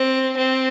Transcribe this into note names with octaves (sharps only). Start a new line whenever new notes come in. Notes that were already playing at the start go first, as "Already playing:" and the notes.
Already playing: C4
C4